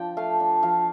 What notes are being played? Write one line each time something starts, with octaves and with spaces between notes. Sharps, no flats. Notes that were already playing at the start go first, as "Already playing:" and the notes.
Already playing: F3 D4 G5
A3 F5
D4
F3 F5